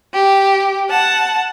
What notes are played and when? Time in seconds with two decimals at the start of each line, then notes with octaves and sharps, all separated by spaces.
0.14 G4
0.90 F#5 A5